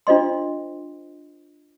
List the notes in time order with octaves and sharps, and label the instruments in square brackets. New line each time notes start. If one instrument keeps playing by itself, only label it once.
[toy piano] D4 F4 C5 D#5 C6